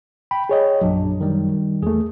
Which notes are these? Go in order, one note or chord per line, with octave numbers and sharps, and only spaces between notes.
G5 B5
G#4 C#5 D#5
A#1 F#2 F#3 D4
D#3 G3
E2 A3 G#4